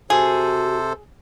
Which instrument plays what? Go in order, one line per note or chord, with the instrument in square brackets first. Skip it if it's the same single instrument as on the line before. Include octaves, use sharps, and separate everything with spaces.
[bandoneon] C3 A4 C5 [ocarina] F#4 [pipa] G#4